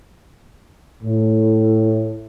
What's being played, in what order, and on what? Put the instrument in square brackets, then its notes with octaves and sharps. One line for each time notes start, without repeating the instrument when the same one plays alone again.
[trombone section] A2